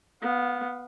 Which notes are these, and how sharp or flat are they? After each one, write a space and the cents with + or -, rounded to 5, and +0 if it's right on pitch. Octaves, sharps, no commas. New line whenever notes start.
B3 +0 F5 +30